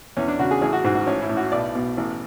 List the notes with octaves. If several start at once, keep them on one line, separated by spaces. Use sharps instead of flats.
E2 C#4
D4
C#3 F#4
G#4
A1 G#4
F#4
G#2 F#4
F#4
A1 C#4
E4
A2
F#4
B1 D5
B2
A1